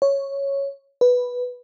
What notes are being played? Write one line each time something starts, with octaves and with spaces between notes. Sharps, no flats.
C#5
B4